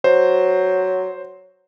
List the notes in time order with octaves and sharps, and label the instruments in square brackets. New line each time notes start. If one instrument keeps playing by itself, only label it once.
[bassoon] F#3 [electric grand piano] C5